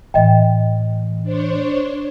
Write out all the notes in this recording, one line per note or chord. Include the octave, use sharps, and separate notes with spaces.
A2 E3 D#5 G5
D4 C5 C#5